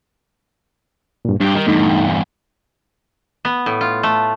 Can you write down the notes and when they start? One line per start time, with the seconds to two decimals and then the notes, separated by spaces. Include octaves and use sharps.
1.25 G2 A#2
1.40 G2 G3 G4
1.55 D#3
1.67 E2 G2 A3 D#4
3.45 B3
3.66 A2
3.81 F4
4.03 A3